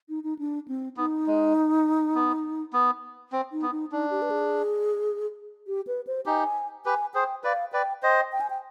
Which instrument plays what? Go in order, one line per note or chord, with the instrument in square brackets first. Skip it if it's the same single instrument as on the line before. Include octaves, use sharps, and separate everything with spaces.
[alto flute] D#4
D#4
D4
C4
[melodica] B3 [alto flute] D#4
[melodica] G#3
B3
B3
C4
[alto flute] D#4
[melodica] B3
[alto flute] D#4
[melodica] D4 [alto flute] D#4
[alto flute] G4
B4
G#4
G4
B4
C5
[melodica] D#4 G4 [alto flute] G#5
[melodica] G4 B4 [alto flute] G#5
[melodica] G#4 C5 [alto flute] G5
[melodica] B4 D5 [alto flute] F5
[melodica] B4 D5 [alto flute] G5
[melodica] C5 D#5 [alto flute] G5
[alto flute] G5
G#5
G5